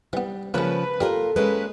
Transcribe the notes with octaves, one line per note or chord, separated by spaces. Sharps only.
E3 G3 B3
C#3 F3 G#3 A#3 C#4 B4
G3 A#3 F4 A4 A#4
G#3 A#3 C#4 B4